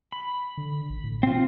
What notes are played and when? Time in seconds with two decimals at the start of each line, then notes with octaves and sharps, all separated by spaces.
0.12 B5
0.57 D3
0.90 A1
1.04 A2
1.23 B2 C4 F4